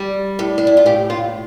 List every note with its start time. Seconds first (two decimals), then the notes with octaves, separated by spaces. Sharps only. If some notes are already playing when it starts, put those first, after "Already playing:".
Already playing: G3
0.39 A2
0.58 D4
0.67 E4
0.77 F4
0.86 A2 G4
1.10 F4